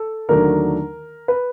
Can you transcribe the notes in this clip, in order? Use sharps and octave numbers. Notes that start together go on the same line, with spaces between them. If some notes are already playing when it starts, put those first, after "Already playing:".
Already playing: A4
D#2 D3 F#3 A3 D4 A#4
B4